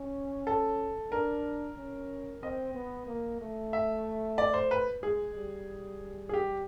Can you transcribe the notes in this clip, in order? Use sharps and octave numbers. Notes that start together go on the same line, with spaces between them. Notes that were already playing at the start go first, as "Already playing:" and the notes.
Already playing: C#4
A4
D4 A#4
C#4
C4 D#5
B3
A#3
A3
E5
D5
C5
B4
G#3 G#4
G3
G#4
G4